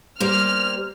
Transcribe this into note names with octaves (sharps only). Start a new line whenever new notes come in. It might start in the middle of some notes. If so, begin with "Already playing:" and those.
G3 A#3 C5 F6